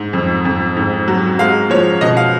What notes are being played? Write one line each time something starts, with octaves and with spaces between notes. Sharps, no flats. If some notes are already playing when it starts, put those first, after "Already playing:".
Already playing: G#2
F2
F2
G#2
F#3
G#3 F5
F3 C#5
B2 D#5
F5